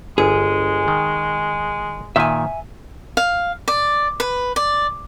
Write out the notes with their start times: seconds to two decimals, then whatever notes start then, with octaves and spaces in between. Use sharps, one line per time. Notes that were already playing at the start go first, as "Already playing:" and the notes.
0.18 G1 G#3 G#4
0.88 D#3
2.16 A#2 D#3 E5 G#5
3.17 F5
3.68 D5
4.20 B4
4.56 D5